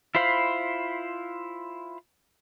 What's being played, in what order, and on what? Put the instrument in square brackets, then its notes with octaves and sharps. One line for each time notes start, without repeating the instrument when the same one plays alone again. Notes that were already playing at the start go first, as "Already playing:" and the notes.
[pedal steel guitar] E4 F4 C5 F5 B5